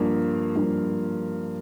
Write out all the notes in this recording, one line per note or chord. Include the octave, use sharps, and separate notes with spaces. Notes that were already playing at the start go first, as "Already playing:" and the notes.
Already playing: G2 F3 A#3 F4
G2 F3 A#3